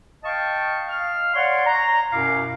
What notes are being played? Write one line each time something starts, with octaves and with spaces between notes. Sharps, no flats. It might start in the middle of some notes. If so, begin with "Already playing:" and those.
D#5 F5 G5 A5 C#6
F5 F6
C#5 D5 F#5 C6
A#5
F#2 B2 E4 F5 D6